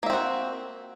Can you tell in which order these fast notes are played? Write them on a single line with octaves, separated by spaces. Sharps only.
A#3 E5 C4 F#4